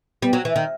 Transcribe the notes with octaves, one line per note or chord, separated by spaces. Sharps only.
G3 B3
F#3
E3
D#3